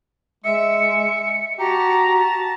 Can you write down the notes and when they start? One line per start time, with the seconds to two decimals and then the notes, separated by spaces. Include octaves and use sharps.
0.44 G#3 E5 C#7
1.59 F#4 G4 A5 A#5
2.16 A5